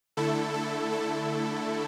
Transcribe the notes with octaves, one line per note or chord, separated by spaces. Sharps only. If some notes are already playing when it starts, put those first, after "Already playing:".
D3 A3 E4 A4
A4
A4